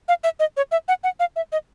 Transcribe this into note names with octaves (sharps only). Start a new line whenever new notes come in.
F5
E5
D#5
C#5
E5
F#5
F#5
F5
E5
D#5